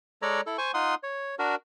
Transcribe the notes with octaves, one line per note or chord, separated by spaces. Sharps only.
G#3 A4 C#5 D5 A#5
E4 A4
C5 G#5 C#6
D#4 F4 F#5 C6 D#6
C#5
D4 F#4 A#4